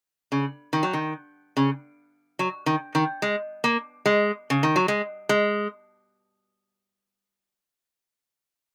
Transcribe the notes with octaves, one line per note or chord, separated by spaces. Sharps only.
C#3
D#3
F#3
D#3
C#3
F#3
D#3
D#3
G#3
A#3
G#3
C#3
D#3
F#3
G#3
G#3